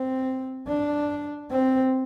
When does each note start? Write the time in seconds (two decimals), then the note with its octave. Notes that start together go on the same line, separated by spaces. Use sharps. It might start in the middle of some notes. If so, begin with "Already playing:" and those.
Already playing: C4
0.67 D4
1.51 C4